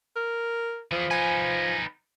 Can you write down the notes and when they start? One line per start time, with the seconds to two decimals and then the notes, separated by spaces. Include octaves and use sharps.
0.16 A#4
0.91 E3 F3 G#4
1.11 D#4 B4 G#5